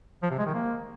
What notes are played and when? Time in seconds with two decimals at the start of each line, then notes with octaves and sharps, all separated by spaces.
0.23 F3
0.30 C3
0.38 G#3
0.46 D#3
0.54 A#3